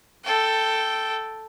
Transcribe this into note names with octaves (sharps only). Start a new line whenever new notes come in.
A4 G5